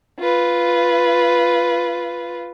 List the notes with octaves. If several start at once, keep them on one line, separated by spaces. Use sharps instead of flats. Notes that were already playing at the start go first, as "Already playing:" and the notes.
F4 B4